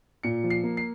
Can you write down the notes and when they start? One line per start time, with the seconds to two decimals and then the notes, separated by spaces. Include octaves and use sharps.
0.23 A#2 C#7
0.44 F3
0.50 C7
0.64 A#3
0.77 C7